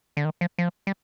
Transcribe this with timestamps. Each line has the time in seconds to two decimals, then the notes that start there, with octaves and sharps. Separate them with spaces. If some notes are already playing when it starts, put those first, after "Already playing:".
0.17 D3
0.25 D#3
0.41 F3
0.58 F3
0.87 G3